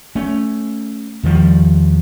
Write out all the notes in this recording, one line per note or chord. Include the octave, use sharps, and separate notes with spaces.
A3 C#4
E2 D#3 F3 G3